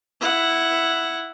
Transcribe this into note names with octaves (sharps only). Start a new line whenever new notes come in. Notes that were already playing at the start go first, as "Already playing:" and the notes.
E4 F#5